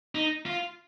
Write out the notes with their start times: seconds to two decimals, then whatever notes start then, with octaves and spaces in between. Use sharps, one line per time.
0.15 D#4
0.46 F4